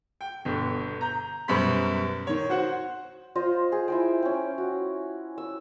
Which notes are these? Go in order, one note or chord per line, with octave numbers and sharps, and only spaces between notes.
G5
G1 B2 D3
A#5 G6
F#2 B2 G3 C5 B5 B6
D#3 C#5
F#4 C5 F#5
F4 C5 D#5
G#4
E4 C5 G5
C#4 G5
F#4
E6